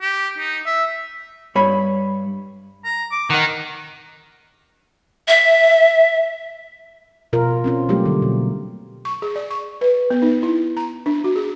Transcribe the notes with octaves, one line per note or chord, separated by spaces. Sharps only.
G4
D#4
E5
G2 C#5 B5
A#5
D6
D#3 D#4 F#5
E5
B2 F4 A#4
C4 C#4 F4
F#3 G3 A3 A#3 G4
D3 F#3
B2
C#6
G#4
D5
C#6
B4
B3
D#4
E4
A#5
D4
F#4
G#4